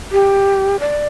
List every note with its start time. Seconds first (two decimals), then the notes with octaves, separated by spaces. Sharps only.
0.12 G4
0.80 D5